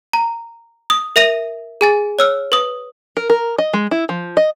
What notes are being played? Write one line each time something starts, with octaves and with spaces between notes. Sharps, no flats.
A#5
D#6
A#4 E5 A#6 D#7 F7
G#4 G#5 A6
C#5 E6 F6
B4 D#6
A#4
A#4
D#5
G#3
E4
F3
D#5